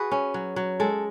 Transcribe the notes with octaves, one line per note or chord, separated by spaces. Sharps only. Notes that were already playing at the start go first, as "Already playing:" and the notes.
Already playing: F#4 G#4 B4
C#4
F#3
F#3
G#3 A4